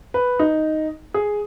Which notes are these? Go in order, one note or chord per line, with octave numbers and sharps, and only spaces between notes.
B4
D#4
G#4